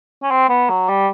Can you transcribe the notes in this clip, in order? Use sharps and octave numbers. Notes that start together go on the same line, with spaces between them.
C#4
C4
B3
F#3
G3